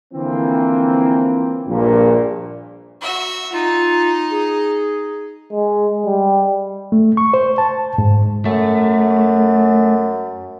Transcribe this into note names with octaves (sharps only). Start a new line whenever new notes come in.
D3 E3 F3 A#3 C4
A#1 G2 A#2
F#4 E5
D#4 F4
G#4
G#3
G3
A3
C#6
C5
A5
G#2
F#2 A3